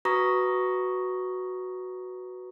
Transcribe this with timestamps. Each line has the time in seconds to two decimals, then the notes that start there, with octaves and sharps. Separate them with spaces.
0.05 F#4 B4 A#5 C#6 D#6 A#6